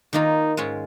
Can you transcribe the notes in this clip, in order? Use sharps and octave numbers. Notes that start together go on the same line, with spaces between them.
D#3 A#3 D#4 F4
G#2 G#3 C#4 F4